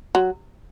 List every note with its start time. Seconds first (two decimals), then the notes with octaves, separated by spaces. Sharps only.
0.15 F#3